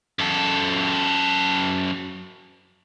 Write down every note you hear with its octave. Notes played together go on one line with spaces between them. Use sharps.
F#2 A4